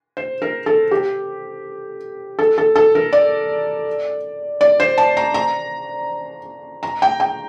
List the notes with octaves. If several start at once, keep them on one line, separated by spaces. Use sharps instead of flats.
C5
A#4
A4
G4
A4
A4
A4
A#4
D5
D5
C5
A5
A#5
A#5
A#5
G5
G5